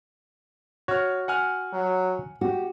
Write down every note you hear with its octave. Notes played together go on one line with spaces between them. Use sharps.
F#4 C#5 F6
F#5 G#5 F6
F#3
F#4 G4